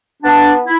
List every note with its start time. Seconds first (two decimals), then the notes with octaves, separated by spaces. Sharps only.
0.23 B3 D4
0.64 E4